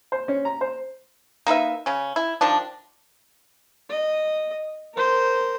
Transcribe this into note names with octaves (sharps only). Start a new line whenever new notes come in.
C5
C#4
A#5
C5
A#3 D#4 B4 E5
C#3 C#4
E4
D#3 F3 D4
D#5
A#4 C5